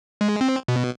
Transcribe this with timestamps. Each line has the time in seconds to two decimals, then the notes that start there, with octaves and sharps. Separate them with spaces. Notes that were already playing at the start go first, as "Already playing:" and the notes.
0.21 G#3
0.41 C4
0.68 B2